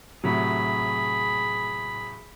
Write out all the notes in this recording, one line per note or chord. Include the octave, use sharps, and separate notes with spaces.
A2 C3 F#3 G#4 B5